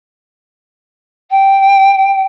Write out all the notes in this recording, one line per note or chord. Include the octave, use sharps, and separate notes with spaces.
G5